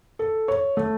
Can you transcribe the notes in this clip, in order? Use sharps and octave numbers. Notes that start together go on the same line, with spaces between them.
A4
C#5
A3